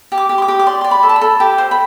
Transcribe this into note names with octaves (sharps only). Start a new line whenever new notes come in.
G4
D6
G4
C6
D6
G4
D6
D5 C6
D5 C6
B5
A4
A5
B5
A4
G4 G5
C5
B5